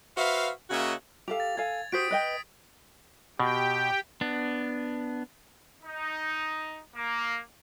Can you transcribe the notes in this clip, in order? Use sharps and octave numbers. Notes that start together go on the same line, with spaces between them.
F#4 B4 C5 E5 F5
C#3 A#3 C#4 F#4 D#5 E5
G4 A4 F5 F7
A6
A4 F5 G#5 G#6
F#4 G4 C5 D#6 B6 D7
B4 D#5 G5
B2 G4 G5
B3 D4
D#4
A#3